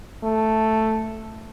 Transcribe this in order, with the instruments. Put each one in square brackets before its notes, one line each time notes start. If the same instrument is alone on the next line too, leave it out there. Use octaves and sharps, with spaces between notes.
[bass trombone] A3